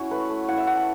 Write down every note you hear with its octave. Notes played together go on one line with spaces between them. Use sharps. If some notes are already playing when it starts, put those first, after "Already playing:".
Already playing: C#4 E4 F#4
A3 B4
A3
E4 F#5
E5
A3 F#5
A5